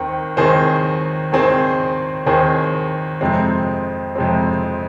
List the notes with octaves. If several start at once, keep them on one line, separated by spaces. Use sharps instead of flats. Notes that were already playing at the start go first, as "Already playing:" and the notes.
Already playing: D#2 D#3 C4
D#2 D#3 C4 G#4 C5
D#2 D#3 C4 G#4 C5
D#2 D#3 C4 G#4 C5
F2 C3 G#3 C4
F2 C3 G#3 C4